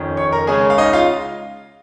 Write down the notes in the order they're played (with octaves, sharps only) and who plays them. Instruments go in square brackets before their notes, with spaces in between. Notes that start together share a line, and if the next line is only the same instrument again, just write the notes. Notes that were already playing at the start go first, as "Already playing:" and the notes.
Already playing: [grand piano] F2 D#3 C#4
C#5 C#6
A#4 A#5
C#3 G#3 C#4 G#4 G#5
F5
D#4 D#5
F4 F5